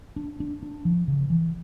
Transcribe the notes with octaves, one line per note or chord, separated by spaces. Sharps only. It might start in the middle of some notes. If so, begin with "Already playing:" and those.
D4
D4
D4
F3
C#3
E3